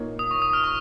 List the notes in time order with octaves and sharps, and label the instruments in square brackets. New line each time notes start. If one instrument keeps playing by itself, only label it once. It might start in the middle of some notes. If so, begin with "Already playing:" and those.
Already playing: [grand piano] A#2 A#3 D#4 C#5
[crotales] D#6
C#6
D#6
F6
C#6